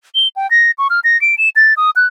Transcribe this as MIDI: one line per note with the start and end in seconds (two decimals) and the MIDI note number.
0.15 0.28 103
0.36 0.49 79
0.51 0.71 94
0.78 0.88 85
0.90 1.00 89
1.04 1.20 94
1.21 1.35 98
1.38 1.49 100
1.56 1.74 93
1.77 1.90 87
1.96 2.07 90